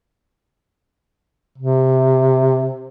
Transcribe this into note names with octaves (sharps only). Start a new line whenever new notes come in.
C3